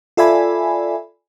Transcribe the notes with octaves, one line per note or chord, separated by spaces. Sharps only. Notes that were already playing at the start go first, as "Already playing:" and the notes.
F4 A4 D5 E5 G#5 B5